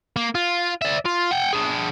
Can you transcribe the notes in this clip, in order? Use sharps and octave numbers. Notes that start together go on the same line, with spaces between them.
A#3
F4
D5 E5
F4
F#5 G5
D4 G#4